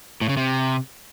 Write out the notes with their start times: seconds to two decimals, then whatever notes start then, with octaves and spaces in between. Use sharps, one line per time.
0.21 A2
0.29 C#3
0.37 C3